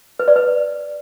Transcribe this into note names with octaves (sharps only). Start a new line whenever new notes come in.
B4
D5
B4